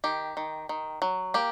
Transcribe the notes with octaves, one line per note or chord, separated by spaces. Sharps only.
D#3 G4
D#3
D#3
F#3
A#3 G4